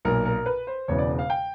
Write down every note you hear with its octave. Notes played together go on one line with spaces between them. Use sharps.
B1 A#2 A#4
A#4
B4
C5
E1 E2 C#3 E3 C#5
D5
F5
G5